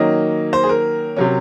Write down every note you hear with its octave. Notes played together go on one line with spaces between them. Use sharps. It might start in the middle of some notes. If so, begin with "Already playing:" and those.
Already playing: D#3 F#3 A#3 C#4 D#5
C5
G#4
A#4
C3 F#3 C#4